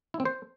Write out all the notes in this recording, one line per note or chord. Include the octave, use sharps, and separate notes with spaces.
E4
C4
C5